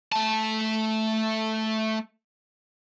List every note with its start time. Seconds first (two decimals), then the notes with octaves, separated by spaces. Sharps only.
0.12 A3 A5